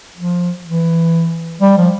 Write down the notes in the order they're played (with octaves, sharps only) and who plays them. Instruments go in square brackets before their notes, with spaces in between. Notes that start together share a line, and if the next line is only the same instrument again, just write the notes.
[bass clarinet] F3
E3
G3
F3